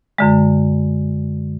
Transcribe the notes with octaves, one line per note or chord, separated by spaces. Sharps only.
F#2 D3 G#3